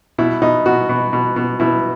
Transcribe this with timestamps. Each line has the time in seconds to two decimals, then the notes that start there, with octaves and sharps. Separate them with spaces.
0.18 B2 E4
0.42 B2 D#4
0.66 B2 F#4
0.89 B2
1.13 B2
1.36 B2
1.60 B2 E4